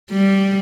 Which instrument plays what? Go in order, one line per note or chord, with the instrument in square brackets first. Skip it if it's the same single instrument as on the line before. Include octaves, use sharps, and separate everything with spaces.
[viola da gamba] G3